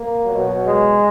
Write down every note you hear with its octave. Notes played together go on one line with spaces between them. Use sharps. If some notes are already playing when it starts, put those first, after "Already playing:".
Already playing: A#3
B2 F#3
G#3